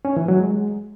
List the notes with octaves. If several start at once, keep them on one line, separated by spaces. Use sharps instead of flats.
C#4
E3
F#3
G#3